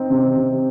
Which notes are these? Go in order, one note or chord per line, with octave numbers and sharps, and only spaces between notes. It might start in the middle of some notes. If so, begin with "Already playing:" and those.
Already playing: C4 D#4
C3
C3